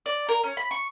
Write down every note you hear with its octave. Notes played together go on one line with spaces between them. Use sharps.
D5
A#4
C#4
B5
C#6